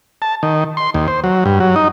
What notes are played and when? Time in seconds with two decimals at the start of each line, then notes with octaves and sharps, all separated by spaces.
0.22 A5
0.43 D#3
0.77 C6
0.94 D#2
1.08 C5
1.24 F#3
1.46 G2
1.60 F#3
1.76 D#4